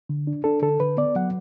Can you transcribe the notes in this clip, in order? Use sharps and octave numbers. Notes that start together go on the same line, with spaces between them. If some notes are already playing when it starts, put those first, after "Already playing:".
D3
D4
D4 A4
D3 A4
D3 B4
B3 D5
F#3 F#5